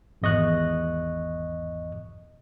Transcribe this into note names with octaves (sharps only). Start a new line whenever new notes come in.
G#1 E2 D#5 C#6 F#6